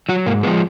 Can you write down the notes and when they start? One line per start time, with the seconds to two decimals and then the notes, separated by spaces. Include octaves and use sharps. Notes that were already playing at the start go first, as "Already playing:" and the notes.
0.09 F#3 F#4
0.26 G#2 A#3
0.43 G#3 B3
0.47 F3